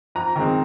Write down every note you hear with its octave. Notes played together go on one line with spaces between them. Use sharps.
F2 A#5
D#3 G#3 C4